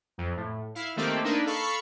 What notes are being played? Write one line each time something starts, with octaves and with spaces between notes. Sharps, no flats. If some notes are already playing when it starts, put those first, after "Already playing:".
F2
A2
E4 F5
D#3 A3 A#3 C4 G4 A4
A#3 D4 D#4 A#4 B4
A4 F5 B5 C#6